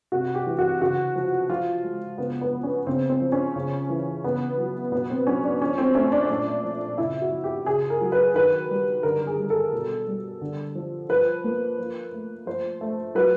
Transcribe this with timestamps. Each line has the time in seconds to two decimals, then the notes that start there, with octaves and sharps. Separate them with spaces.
0.12 C3 F#4
0.35 G4
0.46 E3
0.58 F#4
0.81 C#3 F#4
1.15 F3
1.49 F3 F4
1.83 G#3
2.18 C#3 B3
2.41 B3
2.53 F3
2.63 C#4
2.87 C#3 C4
3.09 C4
3.21 F3
3.32 C#4
3.56 C#3
3.90 E3
4.24 C#3 B3
4.58 F#3
4.92 B2 B3
5.10 C4
5.27 F#3 C#4
5.44 D4
5.62 F3 C#4
5.78 C4
5.95 A3 C#4
6.12 D4
6.30 A#2 D4
6.64 F3
6.98 C#3 E4
7.21 F#4
7.32 F3
7.44 G4
7.66 C#3 G#4
7.90 A#4
8.01 F#3
8.12 B4
8.35 D#3 B4
8.70 G3
9.03 D3 A#4
9.27 G#4
9.38 G3
9.50 A4
9.72 B2
10.07 G3
10.41 D3
10.75 F3
11.09 F3 B4
11.44 A#3
11.78 F3
12.12 A3
12.46 F3 C5
12.81 A3
13.15 F#3 B4